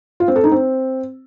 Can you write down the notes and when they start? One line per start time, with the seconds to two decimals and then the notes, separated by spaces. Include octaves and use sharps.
0.20 F4
0.28 C4
0.36 A4
0.44 D#4
0.52 C4